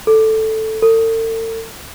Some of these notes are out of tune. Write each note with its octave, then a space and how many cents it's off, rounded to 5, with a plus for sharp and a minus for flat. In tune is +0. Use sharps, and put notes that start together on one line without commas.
A4 +0
A4 +40